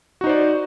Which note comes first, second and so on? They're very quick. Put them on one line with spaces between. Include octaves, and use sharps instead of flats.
F#4 D#4 C5 D5